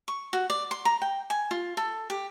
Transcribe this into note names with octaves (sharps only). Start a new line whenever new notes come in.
C#6
F#4
D5
C6
A#5
G5
G#5
F4
A4
G4